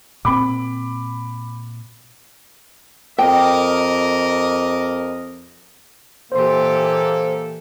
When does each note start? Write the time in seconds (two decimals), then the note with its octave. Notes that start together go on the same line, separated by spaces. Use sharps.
0.25 A#2 C4 B5 D6
3.18 F2 A#4 D#5 G5 D6
6.32 A#2 E3 A#3 G4 A4 C5 C6